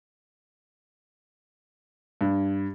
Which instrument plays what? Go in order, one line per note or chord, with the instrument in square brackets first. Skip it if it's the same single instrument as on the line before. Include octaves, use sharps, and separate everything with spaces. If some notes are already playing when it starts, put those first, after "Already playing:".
[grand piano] G2